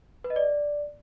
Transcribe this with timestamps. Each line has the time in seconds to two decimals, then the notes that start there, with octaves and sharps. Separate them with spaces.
0.24 B4
0.30 D#5
0.36 D5